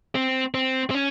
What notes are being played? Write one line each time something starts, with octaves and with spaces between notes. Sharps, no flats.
C4
C4
C4
C#4